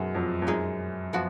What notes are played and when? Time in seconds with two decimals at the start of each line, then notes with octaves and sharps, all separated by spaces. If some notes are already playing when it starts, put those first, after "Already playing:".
Already playing: F#2 B2 G#3 D#4 F#4
0.15 F2
0.42 F2
0.47 F#2 G#3 D#4 G#4
1.13 F3 B3 F#4